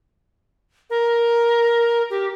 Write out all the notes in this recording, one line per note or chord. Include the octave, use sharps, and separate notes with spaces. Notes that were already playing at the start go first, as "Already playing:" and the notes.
A#4
G4